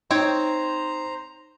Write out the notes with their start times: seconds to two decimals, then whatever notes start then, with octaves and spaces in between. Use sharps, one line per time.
0.11 C4 D#4 C5 C#5 G5 A#5